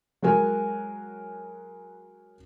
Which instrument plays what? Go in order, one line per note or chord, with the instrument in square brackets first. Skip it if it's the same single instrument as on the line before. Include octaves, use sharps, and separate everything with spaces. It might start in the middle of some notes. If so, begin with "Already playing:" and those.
[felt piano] F#3 G#3 F#4 A#4 G#5